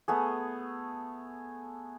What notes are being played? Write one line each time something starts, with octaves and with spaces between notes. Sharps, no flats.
A3 B3 G#4